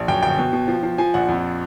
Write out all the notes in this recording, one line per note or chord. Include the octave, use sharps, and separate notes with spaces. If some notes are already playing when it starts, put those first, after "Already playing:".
Already playing: A#1
F#2 G5
G1 G5
B2
B2
F3
F3
F3 G#5
A#1 F#5
F2